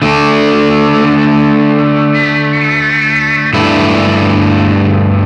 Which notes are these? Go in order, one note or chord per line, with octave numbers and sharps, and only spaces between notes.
D3 A3 D4
G2 D3 A3 E4